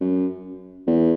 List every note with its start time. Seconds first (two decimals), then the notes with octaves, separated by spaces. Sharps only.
0.01 F#2
0.87 E2